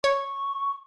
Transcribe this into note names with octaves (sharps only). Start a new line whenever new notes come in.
C#5 C#6